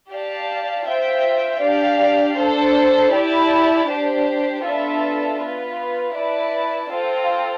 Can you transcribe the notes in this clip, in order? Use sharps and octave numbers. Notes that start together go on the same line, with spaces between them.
G4 D5 F5 A5
C4 F4 C5 E5 G5
D4 G4 D5 F5
D4 A4 C5
E4 G4 D5 A5
D4 G4 C5
B3 D4 F4 A4 E5
B3 F4 B4
E4 B4 D5 A5
C4 F4 A4